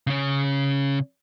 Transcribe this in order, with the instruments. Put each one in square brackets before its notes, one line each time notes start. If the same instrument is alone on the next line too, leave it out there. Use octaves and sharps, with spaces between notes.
[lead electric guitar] C#3 C#4